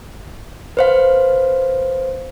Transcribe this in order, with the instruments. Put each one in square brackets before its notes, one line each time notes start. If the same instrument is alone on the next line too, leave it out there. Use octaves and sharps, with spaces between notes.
[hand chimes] B4 C5 F5